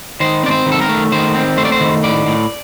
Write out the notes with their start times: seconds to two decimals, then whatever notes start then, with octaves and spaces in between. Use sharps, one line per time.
0.20 D#3 C5
0.44 C4 D5
0.51 C5
0.66 D#3
0.72 A4
0.81 A#4
0.89 A3
1.12 D#3 C5
1.35 C4
1.57 A3 C5
1.65 D5
1.72 C5
1.80 D#3
2.03 A2 D5
2.27 A2